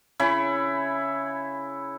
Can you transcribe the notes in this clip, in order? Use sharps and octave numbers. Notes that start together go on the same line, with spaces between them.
C#3 E4 C#5 B5